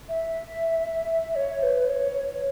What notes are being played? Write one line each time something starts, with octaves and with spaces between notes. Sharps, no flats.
E5
C#5
B4
C#5